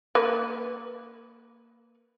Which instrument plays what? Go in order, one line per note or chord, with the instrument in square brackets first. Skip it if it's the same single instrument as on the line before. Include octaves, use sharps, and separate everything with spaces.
[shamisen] A#3 B4